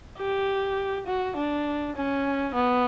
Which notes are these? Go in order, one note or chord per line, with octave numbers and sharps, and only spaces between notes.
G4
F#4
D4
C#4
B3